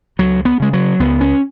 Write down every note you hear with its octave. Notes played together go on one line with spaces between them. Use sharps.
C#2 F#3
B3
C#3 G#3
F#3
C#2 B3
C#4